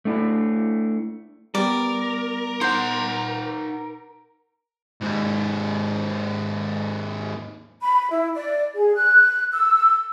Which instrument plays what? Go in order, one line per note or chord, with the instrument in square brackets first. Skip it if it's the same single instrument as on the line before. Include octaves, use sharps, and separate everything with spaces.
[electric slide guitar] A3 D4 E4
[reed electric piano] G3 B3 [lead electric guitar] A#4 [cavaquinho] D5
[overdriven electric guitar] D#4 F#5 [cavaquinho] C5
[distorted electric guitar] D#2 G#2
[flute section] B5
E4
D5
G#4
F#6
E6